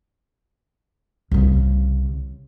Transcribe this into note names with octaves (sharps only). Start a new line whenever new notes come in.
C2 C#3